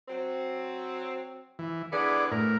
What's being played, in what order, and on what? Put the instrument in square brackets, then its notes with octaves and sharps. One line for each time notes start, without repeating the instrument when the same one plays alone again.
[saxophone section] F#3 C4
[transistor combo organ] E3
[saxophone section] D3 E3 B3 [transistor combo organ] G#4 D5
[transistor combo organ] A2 A#4